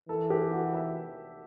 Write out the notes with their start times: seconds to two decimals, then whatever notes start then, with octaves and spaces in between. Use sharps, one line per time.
0.08 E3 A4
0.30 G4
0.51 F#4
0.73 E5